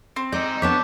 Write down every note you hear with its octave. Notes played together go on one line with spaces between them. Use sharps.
C4
G#3 D#4 D5 G6
F2 B3 D4 C#5 A5 D6 G6 B6